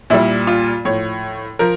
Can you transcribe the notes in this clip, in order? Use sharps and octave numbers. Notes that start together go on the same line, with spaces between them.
A#2 G3 E4
F4
A2 F3 C#5
F3 A#4